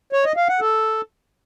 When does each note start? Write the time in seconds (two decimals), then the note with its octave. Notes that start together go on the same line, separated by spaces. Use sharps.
0.13 C#5
0.25 D#5
0.37 F5
0.49 F#5
0.61 A4